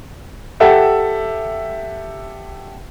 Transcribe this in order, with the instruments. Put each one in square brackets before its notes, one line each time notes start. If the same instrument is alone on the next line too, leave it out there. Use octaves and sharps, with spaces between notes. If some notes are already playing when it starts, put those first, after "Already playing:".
[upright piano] G4 A4 E5 F#5